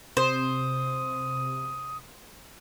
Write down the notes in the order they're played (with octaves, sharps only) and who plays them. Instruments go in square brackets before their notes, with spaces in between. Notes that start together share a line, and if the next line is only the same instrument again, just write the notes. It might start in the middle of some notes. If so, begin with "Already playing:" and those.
[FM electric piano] C3 [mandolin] C5 [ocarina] D#6